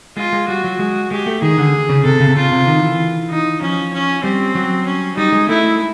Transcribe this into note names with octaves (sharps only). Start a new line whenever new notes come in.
G#3 F4
G#3
G3 F#4
F#3
G#3
G#3 G4
A3
D#3 G#4
D3
C#3
C3 A4
C#3
C3
C#3 F4
C3
D#3
E3
D#4
F3 C#4
C#4
G3 C4
F#3
C#4
G3 D#4
G#3
A3 E4